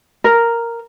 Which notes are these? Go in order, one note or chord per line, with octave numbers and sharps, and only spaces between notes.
A#4